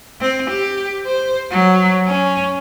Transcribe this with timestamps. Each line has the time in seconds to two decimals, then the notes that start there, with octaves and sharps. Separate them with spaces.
0.21 C4
0.51 G4
1.06 C5
1.51 F#3
2.08 C#4